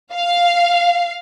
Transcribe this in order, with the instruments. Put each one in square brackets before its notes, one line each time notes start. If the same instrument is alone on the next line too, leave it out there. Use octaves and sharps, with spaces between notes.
[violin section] F5